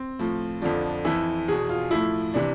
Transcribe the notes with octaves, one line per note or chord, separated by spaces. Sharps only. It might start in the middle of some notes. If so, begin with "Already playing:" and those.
Already playing: C4
A2 F3
F2 D3 F3 D4
F2 E3 E4
E2 B2 G#4
F4
A2 F3 E4
C3 E3 D4